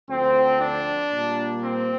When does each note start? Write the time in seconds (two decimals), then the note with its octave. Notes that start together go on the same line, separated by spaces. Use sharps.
0.09 D2 D3 F3 C4
0.61 D4
1.12 A#2 G3 A#3
1.63 C4